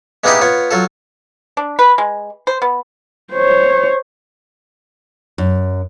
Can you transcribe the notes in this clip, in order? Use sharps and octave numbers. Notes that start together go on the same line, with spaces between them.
G#3 A#3 B3 D#4 E4 G4
B3 F4 C#5
F#3 F4 A4
D4
B4
G#3
C5
B3
C5 C#5
F#2